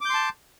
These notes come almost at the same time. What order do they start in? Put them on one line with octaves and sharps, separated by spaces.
D6 G6 C6 A5